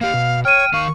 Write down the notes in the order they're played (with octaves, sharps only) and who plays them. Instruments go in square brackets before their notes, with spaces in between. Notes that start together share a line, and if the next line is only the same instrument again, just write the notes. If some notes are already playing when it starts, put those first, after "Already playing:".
[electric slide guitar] A#3 G4 [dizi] F5
[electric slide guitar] B2
[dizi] C#5 [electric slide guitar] G5 [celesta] F6 D#7
[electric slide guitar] D#3 F5 [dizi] C#6